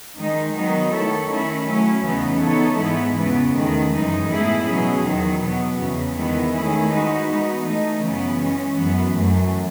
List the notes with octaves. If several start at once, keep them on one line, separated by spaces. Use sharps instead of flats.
D#3 G#3 D#4
D#3 F#3 B3 D#4
D#3 A3 E4 A4 C#5
D#3 A3 C#4 E4
F#3 A3 C#4 E4
E2 C#3 E3 B3 D#4
E3 B3 D#4 A4 C#5
G#2 E3 G#3 B3 E4
E2 C#3 E3 B3
E2 D#3 A3
F#2 E3 G#3 D#4
A2 E3 B3 E4 G#4
B2 F#3 C#4 G#4
E2 D#3 F#3
B2 F#3 B3
E2 C#3 E3
D#3 G#3 B3 E4
D#3 A3 C#4 E4 G#4
G#3 D#4 F#4 B4
E3 B3 D#4
E3 A3 D#4
F#2 C#3 E3 B3
E3 G#3 C#4
F#2 E3 B3
F#2 E3 A3